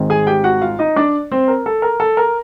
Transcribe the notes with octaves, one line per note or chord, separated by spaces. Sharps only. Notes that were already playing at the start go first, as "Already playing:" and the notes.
Already playing: G#1 G#2 D#3 G#3 C4
G#4 G#5
G4 G5
F#4 F#5
F4 F5
D#4 D#5
D4 D5
C4 C5
A#4
A4
A#4
A4
A#4